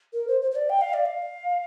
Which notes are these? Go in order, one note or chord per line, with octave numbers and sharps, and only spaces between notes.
A#4
C5
C5
C5
D5
G5
F5
D5
F5